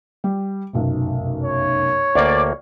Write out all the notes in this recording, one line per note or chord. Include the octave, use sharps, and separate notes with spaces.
G3
F1 B1 F#2
C#5
D2 A#3 D5